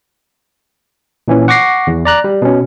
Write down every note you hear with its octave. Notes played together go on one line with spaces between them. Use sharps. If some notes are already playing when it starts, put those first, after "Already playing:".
A#2 E3 C#4
F#5 C#6 D6 A#6 C7
E2
D5 A#5 F#6
G3
B2 C#4